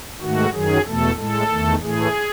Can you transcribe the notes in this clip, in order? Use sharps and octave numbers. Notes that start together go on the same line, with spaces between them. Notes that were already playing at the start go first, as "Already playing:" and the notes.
G#2 D#3 A3 F#4
F#2 D#3 F#3 G#4
E2 B2 A3 A4
A2 G#3 A4
E2 D#3 A3
A2 E3 A3 G#4